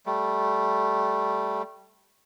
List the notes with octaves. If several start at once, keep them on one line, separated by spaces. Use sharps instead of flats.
G3 A3